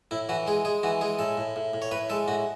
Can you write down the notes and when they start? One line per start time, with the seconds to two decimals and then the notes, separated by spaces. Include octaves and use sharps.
0.11 A2 E4
0.29 E3 F#4
0.47 G#3 G#4
0.65 G#3 G#4
0.83 E3 F#4
1.01 G#3 G#4
1.19 A2 A4
1.37 A2
1.56 A2
1.74 A2
1.82 C#5
1.91 A2 B4
2.10 G#3 A4
2.28 A2 F#4